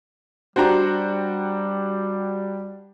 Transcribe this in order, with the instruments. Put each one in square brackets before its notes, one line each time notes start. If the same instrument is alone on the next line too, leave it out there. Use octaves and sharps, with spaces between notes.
[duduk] G3 [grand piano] D4 C5 [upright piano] F#4 G4 A#5